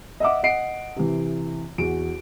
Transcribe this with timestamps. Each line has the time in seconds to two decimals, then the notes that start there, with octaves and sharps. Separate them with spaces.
0.20 D#5 E5 F#5 D6
0.43 D#5 F#5 C7 D7
0.96 C3 E3
1.78 E2 F#4 D7